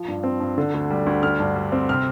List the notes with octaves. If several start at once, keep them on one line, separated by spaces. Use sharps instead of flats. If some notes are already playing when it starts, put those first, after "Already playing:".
Already playing: F3
G2
C4
G2
D3
D2
G3
D2
D3 F6
G2
G3
C4
C3 F6